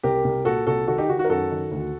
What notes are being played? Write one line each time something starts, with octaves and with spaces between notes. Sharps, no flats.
C2 G4 A#4
C2
A#2 F#4 A4
C2 F#4 A4
D#3 F#4 A4
D#4 G4
D#3 F#4
F#4
A#4
F#2 F#4 A4
D#3
D2